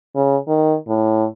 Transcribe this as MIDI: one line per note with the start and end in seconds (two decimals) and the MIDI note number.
0.16 0.37 49
0.48 0.76 51
0.88 1.26 45